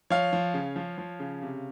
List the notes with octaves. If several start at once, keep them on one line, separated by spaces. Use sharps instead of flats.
F3 C#5 F5
F3
C#3
F3
F3
C#3
C3